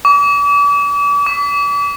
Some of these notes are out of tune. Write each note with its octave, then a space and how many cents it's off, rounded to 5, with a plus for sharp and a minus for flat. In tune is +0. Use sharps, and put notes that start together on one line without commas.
D6 -40
D6 -35